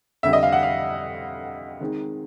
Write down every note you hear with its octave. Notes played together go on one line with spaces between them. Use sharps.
F2 D3 G3 E5
D#5
F5
F#5
F5
D#3 G#3 C4 D#4